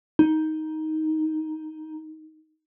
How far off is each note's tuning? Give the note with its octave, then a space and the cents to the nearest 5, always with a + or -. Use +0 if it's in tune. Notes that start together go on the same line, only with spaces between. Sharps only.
D#4 +10